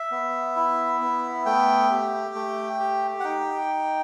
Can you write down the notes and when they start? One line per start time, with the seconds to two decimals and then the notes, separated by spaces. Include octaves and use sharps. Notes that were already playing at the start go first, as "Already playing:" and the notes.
Already playing: E5
0.11 B3
0.56 E4
1.01 B3
1.46 A3 G5
1.91 G4
2.35 A3
2.80 G4
3.20 F#5
3.24 D#4 G5